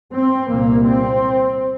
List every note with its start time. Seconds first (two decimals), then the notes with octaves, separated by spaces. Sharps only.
0.13 C4
0.49 C2 A#2 A#3
0.87 C4